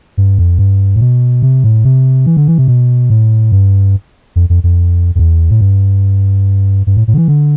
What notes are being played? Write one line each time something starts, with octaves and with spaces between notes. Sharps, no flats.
G2
F2
G2
A2
B2
C3
A2
C3
E3
D3
E3
C3
B2
A2
G2
F2
F2
F2
F2
E2
A2
G2
G2
A2
A2
D3
E3
D3